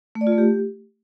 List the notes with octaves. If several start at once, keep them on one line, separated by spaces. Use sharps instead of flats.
A3
D5
F4
A3
G4